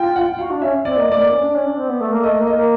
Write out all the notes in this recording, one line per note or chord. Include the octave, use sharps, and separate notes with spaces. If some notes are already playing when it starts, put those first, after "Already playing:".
Already playing: F4 G5
F#5
F#4 F5
D4
C#4 E5
C4 D5
A#3 D#5
A3 D5
A#3
C#4
D4
C#4
D4
C4
B3
A3
A#3
A3 D#5
A#3
D#5
A#3